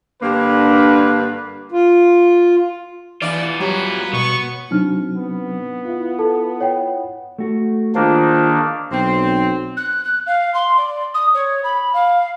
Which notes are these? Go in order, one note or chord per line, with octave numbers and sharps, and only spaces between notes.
G2 D3 A#3 B4
F4
E3 B3 F4 D5
F#3 G3 B4
B2 B3 C#6
C3 F#3 C4 D4 D#4 F6
B3
E4 F4
A4 A5
C#5 F#5 G5
A3 F#4
D#3 A#3 D4 F4 G#4 C5
B1 C4
F#6
F#6
F5
C6
D5
D#6
C#5
B5
F5